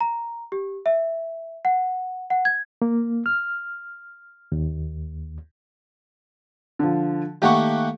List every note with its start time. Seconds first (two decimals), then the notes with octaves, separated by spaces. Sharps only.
0.01 A#5
0.52 G4
0.86 E5
1.65 F#5
2.30 F#5
2.45 G#6
2.82 A#3
3.26 F6
4.52 D#2
6.79 D3 F3
7.42 D#3 A3 A#3 G4 F#5 C#6